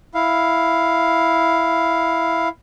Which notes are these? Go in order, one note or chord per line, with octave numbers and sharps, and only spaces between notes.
E4 F5